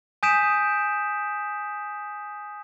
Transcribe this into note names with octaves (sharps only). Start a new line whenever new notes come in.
G#5 D#6 G6 B6 D7 E7